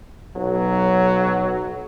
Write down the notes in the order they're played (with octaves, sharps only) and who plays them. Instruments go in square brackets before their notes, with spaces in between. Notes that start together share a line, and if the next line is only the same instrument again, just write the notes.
[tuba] B1 [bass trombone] F#3